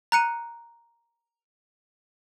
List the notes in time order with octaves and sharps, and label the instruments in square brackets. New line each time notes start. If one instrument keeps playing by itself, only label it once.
[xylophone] A#5 F#6 C#7 D#7